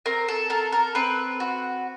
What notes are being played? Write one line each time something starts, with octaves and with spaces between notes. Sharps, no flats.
C4 A#4
A4
A4 A#4
A#4
C4 B4
F#4